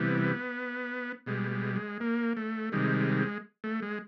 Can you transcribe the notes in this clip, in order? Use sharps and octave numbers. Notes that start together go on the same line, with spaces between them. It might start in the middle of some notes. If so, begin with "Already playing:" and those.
Already playing: C3 E3 G3 B3
B2 G3 G#3
G#3
G#3
A#3
A3
C3 D#3 G3 G#3
A3
G#3